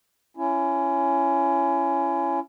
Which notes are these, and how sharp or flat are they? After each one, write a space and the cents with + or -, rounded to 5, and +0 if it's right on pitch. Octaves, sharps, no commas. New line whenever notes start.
C#4 +5 E4 +35